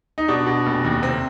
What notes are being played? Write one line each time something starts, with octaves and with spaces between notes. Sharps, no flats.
D#4
B2 D4
B2
F1
D#2
C3 C4